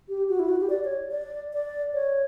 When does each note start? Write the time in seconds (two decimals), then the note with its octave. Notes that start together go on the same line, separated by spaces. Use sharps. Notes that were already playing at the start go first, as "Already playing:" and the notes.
0.09 G4
0.29 F#4
0.39 E4
0.49 F#4
0.60 G4
0.70 D5
0.84 C#5
1.11 D5
1.53 D5
1.94 C#5